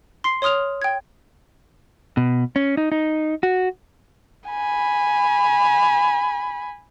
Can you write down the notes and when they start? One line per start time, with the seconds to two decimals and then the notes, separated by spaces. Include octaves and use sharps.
0.24 C6 C7
0.42 C#5 C6 D#6 F6 F7
0.82 G5 G#6
2.17 B2
2.56 C#4
2.77 D#4
2.92 D#4
3.43 F#4
4.49 G#5 B5